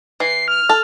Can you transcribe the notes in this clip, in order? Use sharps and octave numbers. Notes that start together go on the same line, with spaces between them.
E3 C7
F6
A4